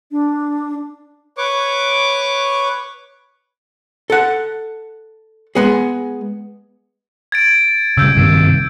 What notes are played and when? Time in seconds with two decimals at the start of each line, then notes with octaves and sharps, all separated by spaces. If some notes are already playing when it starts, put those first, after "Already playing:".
0.11 D4
1.37 B4 C#5 C#6 D6
4.10 A4 F#5
5.55 G#3 B3 G#4
7.32 G#6 A6 D7
7.97 C#3 G3 E6 G6
8.17 G2 C3 D#3